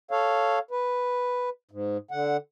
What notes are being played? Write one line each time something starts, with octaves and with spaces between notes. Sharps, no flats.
A4 C#5 F5
B4
G#2
D3 F#5